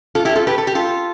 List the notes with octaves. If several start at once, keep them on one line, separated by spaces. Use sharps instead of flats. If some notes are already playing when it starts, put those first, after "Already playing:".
F4 A4
E4 G4
F4 A4
G4 B4
A4
G4
F4 A4